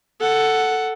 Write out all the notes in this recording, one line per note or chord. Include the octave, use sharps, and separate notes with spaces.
A4 F#5